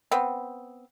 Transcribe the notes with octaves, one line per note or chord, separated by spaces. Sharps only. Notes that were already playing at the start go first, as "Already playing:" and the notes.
B3 C4